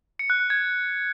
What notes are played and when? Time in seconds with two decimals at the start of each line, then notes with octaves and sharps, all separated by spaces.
0.19 C#7
0.30 F#6
0.40 F#6
0.50 G#6